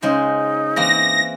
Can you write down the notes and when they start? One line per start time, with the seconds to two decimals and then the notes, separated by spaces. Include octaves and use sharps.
0.02 C#3 G#3 D#4 C5
0.76 E3 A#3 C4 A#6